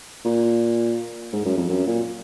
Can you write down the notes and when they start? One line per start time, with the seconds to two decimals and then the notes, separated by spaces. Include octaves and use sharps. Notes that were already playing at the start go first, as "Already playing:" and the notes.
0.25 A#2
1.33 G#2
1.45 F#2
1.57 F2
1.70 F#2
1.87 A#2